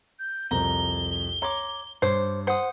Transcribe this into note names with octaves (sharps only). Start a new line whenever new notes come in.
G6
C2 F2 A#5 G7
C#5 A#5 C6 D6
G2 C5 C#5 D6
C5 F#5 D#6